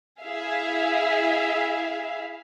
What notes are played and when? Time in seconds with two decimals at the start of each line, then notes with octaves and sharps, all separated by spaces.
0.22 E4 G#4 E5 F5